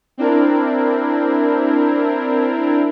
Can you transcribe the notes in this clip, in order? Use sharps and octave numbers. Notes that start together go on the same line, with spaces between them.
C4 D4 E4 A#4